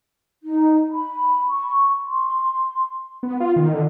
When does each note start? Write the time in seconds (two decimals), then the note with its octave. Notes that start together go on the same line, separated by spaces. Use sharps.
0.43 D#4
0.92 B5
1.48 C#6
2.06 C6
3.23 B3
3.40 F4
3.56 D#3
3.74 D3